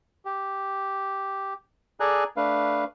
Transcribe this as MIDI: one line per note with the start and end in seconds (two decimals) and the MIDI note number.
0.25 1.54 67
2.00 2.24 68
2.00 2.24 69
2.00 2.24 74
2.00 2.24 80
2.00 2.24 82
2.00 2.24 90
2.37 2.84 57
2.37 2.84 62
2.37 2.84 71
2.37 2.84 77